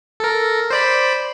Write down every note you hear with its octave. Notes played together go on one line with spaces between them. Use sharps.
A4 A#4
C5 D5 B5